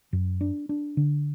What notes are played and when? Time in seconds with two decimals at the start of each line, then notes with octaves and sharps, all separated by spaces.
0.13 F#2
0.41 D4
0.69 D4
0.97 D3